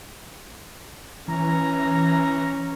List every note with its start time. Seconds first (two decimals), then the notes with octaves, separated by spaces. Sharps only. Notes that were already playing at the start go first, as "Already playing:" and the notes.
1.28 E3 C#4 A#5